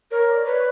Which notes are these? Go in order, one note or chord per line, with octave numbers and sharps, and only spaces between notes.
A#4 C#5
D5
B4 C#5